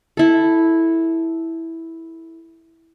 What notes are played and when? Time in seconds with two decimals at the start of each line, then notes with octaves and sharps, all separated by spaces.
0.17 E4 A4